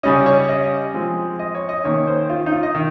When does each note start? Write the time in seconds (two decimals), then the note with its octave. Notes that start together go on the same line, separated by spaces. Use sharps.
0.03 C#3 G3 C#4 D#5
0.26 C#5
0.49 D#5
0.94 F3 G#3 C4
1.39 D#5
1.55 C#5
1.69 D#5
1.84 D#3 A#3 C#4 C#5
2.07 C5
2.29 F4
2.46 D#4
2.52 F4
2.63 D#5
2.75 D#3